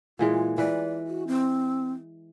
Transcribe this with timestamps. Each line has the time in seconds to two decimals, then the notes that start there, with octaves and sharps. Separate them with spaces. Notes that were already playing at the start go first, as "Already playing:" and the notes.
0.19 A#2 E3 G#3 F4
0.58 E3 B4 D5
1.07 F#4
1.27 C4